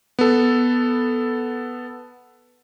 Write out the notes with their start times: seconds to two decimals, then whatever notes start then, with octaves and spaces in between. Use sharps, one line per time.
0.19 B3 A4